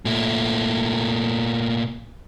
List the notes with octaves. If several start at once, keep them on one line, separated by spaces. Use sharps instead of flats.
A#2 A3